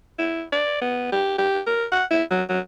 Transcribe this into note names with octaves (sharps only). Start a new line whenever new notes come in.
E4
D5
B3
G4
G4
A#4
F#5
E4
F#3
F#3